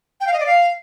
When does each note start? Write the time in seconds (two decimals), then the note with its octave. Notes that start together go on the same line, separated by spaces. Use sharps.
0.21 G5
0.27 F5
0.33 D#5
0.40 D5
0.46 F5